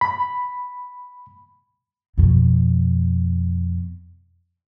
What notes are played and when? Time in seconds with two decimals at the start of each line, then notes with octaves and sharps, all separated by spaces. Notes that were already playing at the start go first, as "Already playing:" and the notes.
0.01 B5
2.18 F2 B2